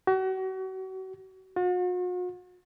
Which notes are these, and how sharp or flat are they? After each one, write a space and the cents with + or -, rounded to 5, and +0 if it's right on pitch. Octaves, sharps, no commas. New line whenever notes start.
F#4 +35
F#4 -45